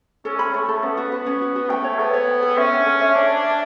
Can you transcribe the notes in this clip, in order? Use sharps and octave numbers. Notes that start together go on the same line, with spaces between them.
C#4 A4
B5
A3 A4
A4
B3 C#4
F#4
B3 B4
C#4
F#4
F#4
A3 G5
C#5
B3 A4
C#5
G5
A4
C#4 E5
D4
A4
E5
D4 C#5
C#5
E5